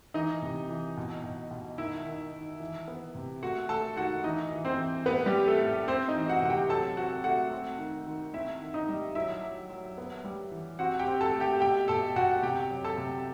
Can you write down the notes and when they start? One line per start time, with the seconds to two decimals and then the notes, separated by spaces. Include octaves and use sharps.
0.14 E3 D#4 D#5
0.42 C3
0.69 E3
0.97 B2
1.24 B2
1.51 B2
1.78 D#3 E4 E5
2.06 D#3
2.33 D#3
2.60 E3
2.88 B3
3.15 C3
3.42 A3 F#4 F#5
3.69 A3 A4 A5
3.96 D#3 F#4 F#5
4.24 E3 D#4 D#5
4.52 E3
4.65 C4 C5
4.78 E3
5.06 A2 B3 B4
5.26 G3 G4
5.33 C4
5.47 A3 A4
5.60 A2
5.88 A3 C4 C5
6.08 D#4 D#5
6.15 E3
6.28 F#4 F#5
6.42 C3 F#5
6.49 G4 G5
6.69 F#3 A4 A5
6.97 C4 F#4 F#5
7.24 A3 F#4 F#5
7.51 C4
7.78 D#3
8.07 D#3
8.34 C4 E4 E5
8.62 D#3
8.74 D#4 D#5
8.89 G3
9.15 F#3 E4 E5
9.43 F#3
9.70 F#3
9.98 B3
10.25 G3
10.51 E3
10.79 C4 F#4 F#5
10.99 G4 G5
11.07 C4
11.21 A4 A5
11.34 A3
11.40 G4 G5
11.61 B2 G4 G5
11.88 B2 A4 A5
12.16 B2 F#4 F#5
12.42 C3 G4 G5
12.70 F#3
12.84 A4 A5
12.98 C3